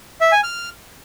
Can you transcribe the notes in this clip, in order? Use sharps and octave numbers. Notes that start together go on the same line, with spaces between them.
E5
G#5
F6